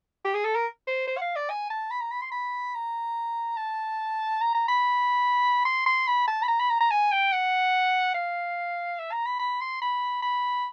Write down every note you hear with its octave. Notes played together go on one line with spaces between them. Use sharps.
G4
G#4
A4
A#4
C5
C5
F#5
F5
D5
G#5
A5
B5
A#5
B5
C6
B5
A#5
A5
A#5
A#5
B5
C6
C6
B5
A5
B5
A#5
B5
A#5
A#5
G#5
G5
F#5
F5
E5
A#5
B5
B5
C6
B5
B5